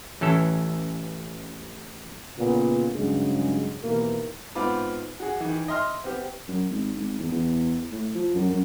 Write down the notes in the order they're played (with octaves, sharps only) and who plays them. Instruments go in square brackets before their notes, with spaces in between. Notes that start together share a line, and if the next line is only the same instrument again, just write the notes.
[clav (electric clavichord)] A1 E3 C#4 A4
[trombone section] A#2 C#3 B3
G2 C#3 F#3 G#3
D#2 B2 E3 A#3
[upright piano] G#2 B3 C4 F4 B5 D6
F#4 G#4
D#3 E3
D#5 E5 C6 F6
B3 C4 G4
[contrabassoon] F#2
G#1
G#1
E2
E2
A2
F3
F#2
F#2